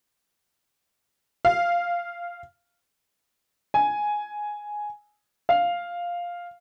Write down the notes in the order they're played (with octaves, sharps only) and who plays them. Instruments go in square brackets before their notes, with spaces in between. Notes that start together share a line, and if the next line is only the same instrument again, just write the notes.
[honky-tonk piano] F5
[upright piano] G#5
F5